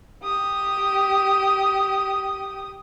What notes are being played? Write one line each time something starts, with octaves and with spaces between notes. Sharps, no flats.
G4 D#6